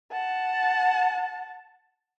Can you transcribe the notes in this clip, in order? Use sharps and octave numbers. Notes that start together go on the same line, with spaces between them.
F#5 A5